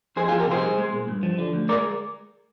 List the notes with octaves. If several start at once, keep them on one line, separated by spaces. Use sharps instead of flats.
F2 G#4 C5
F4 G#4
F3
G4 A#4
C3 G#4 C5
C2
G#3
A#2
G2
F3
D3
D2
G#3 A#4 D5